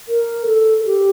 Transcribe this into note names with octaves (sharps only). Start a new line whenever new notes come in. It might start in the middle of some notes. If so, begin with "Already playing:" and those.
A#4
A4
G4